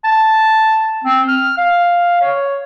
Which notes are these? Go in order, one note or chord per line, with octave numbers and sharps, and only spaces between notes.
A5
C4
F6
F5
C#5